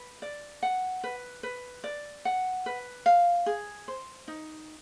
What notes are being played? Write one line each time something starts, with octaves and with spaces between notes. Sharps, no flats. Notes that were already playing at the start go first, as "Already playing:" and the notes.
Already playing: B4
D5
F#5
B4
B4
D5
F#5
B4
F5
G#4
C5
D#4